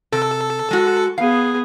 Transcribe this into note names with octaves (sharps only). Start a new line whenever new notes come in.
C3 A4
G#3 F#4
B3 G#4 F5